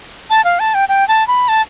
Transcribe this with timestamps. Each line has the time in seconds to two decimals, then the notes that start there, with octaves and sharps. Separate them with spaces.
0.30 A5
0.44 F5
0.60 A5
0.74 G5
0.89 G5
1.08 A5
1.28 B5
1.48 A5